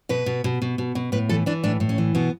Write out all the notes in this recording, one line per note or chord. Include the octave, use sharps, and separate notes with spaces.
B2 B4
B2
B2
B2
B2
B2
A2 B4
E3 A4
E3 D4
A2 D4
A2
C#4
E3
B2 B3